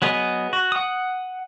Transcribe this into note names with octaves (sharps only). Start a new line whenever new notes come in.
F#3 B3 G#4 D#5
F#4
F#5 D#6